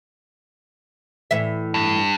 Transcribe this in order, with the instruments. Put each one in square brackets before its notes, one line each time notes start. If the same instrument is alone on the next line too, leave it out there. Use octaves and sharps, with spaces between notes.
[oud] A2 E3 E5
[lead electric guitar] G2